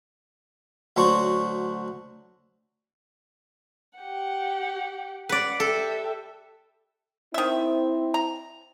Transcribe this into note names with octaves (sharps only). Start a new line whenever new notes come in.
D2 F#3 D4 F#4 C5 C#6
G4 F#5
B4 D5 F#5
G4 A4 E5
D#3 C4 E4 E5
A#5